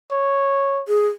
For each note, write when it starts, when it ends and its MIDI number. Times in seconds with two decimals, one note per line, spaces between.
0.11 0.82 73
0.88 1.07 68